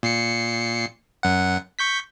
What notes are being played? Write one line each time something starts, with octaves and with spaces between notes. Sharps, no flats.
A#2 C7 C#7
F#2 F#5
C#6 G6 B6